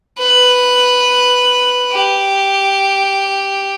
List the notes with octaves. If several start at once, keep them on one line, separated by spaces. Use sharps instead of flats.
B4
G4